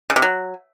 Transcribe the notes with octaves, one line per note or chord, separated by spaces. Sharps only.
C#3
C3
F#3